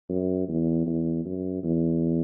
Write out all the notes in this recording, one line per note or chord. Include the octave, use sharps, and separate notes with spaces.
F#2
E2
E2
F#2
E2